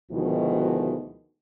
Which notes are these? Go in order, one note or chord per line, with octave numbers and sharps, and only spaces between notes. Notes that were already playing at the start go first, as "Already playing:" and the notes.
D2 B2 D#3 F3 G#3 E4